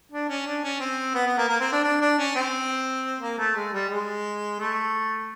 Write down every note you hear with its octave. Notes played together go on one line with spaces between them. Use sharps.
D4
C#4
D4
C#4
C4
B3
B3
A#3
A#3
C4
D4
D4
D4
C#4
C4
A#3
A3
G#3
G3
G#3
A3